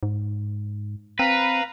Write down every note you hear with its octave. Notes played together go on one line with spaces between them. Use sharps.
G#2
C4 B4 F5 A#5